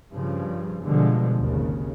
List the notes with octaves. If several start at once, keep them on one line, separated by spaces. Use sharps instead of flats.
G2 C#3 F3
G2 B2 D3 F3 G#3
G#1 D#2 C#3